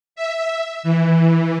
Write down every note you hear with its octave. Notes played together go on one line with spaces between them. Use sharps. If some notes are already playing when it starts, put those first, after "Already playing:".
E5
E3